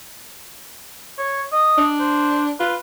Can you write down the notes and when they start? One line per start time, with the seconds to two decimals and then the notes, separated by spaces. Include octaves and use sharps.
1.18 C#5
1.52 D#5
1.77 D4
2.00 C5
2.60 F4 B4